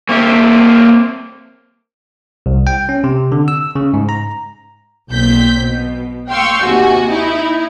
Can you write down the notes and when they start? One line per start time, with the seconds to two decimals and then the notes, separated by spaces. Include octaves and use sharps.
0.09 A#3 C4 F#4 E5
2.46 C2
2.67 G5
2.89 C#4
3.04 C3
3.32 D3
3.48 E6
3.75 C#3
3.94 G#2
4.09 A#5
5.09 B1 A#2 C4 G6 B6
5.61 B2
6.30 F5 G5 C6 C#6 E6
6.62 D#2 C3 F#4 G#5
7.09 D#4 E4